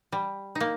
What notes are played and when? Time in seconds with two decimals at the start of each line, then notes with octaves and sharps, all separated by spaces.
0.12 G3
0.55 D#4
0.60 A#3